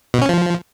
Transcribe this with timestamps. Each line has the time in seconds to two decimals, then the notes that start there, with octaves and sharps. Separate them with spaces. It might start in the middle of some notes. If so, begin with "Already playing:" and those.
0.14 B2
0.22 C#4
0.29 F3